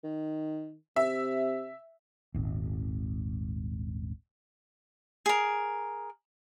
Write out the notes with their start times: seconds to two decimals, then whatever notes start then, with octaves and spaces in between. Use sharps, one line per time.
0.04 D#3
0.96 C3 E5
2.34 D#1 G#1
5.26 G#4 A#4